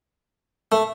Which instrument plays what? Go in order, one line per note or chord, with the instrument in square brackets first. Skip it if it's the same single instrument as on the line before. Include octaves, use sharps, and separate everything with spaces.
[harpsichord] A3